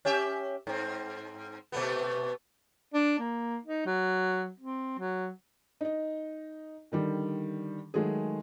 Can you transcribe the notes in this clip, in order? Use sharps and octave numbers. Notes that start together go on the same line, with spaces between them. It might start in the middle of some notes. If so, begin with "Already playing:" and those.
C#4 G4 E5
G#2 C4
B2 A3 B3
D4
A#3
D#4
F#3
C4
F#3
D#4 D#5
D3 D#3 G3
D#3 F#3 G#3 A3 G#4